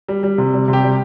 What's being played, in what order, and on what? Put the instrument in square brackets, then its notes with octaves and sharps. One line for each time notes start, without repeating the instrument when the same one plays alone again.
[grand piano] G3
G3
C3
G3
C3
G4
G3